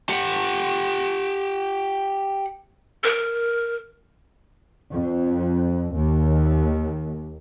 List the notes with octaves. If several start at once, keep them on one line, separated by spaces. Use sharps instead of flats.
G4 F#5
A#4
F2
D#2